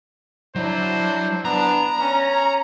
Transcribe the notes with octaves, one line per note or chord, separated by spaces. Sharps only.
F#3 D4 E4 C5
B3 D4 A#5
C#4